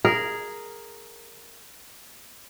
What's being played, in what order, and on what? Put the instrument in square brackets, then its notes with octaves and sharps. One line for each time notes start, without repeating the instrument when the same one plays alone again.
[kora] G#4 A#4